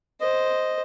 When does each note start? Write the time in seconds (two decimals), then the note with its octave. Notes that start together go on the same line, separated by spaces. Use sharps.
0.21 C5 D#5